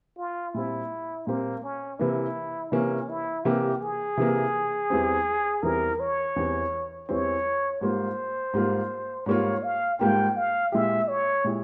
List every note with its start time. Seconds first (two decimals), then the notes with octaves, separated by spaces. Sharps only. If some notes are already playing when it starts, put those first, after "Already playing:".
0.18 F4
0.54 A#2 G3 C4 E4
1.27 A#2 G3 A#3 C4
1.63 C#4
1.99 C3 E3 A#3 E4
2.72 C3 E3 A#3 C#4
3.09 E4
3.45 C3 E3 A#3 G4
3.82 G#4
4.17 C3 E3 A#3
4.90 E2 E3 G3 C4
5.63 E2 E3 G3 C4 A#4
6.00 C#5
6.36 E2 E3 G3 C4
7.09 E2 E3 G3 C4 C#5
7.81 G#2 G3 A#3 F4 C5
8.53 G#2 G3 A#3 F4
9.26 G#2 G3 A#3 F4 C#5
9.63 F5
9.99 G#2 G3 A#3 F4 G5
10.36 F5
10.72 A#2 G#3 E4 G4 E5
11.08 C#5
11.44 A#2 G#3 E4 G4